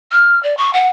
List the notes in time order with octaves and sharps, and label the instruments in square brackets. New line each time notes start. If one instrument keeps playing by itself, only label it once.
[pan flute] F6
D5
C#6
F#5